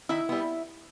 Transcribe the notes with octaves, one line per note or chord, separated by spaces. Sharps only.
D#3 E4 E5
G3 B3